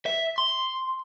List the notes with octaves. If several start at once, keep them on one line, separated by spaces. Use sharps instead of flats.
E5
C6